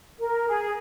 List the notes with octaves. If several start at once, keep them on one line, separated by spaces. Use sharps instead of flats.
A#4
G#4